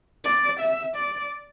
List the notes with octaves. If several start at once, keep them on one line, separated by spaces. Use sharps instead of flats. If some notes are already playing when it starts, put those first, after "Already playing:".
D5
E5
D5